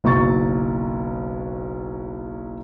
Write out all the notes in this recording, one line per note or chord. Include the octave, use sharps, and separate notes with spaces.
F#1 B1 F#3 C#6 A6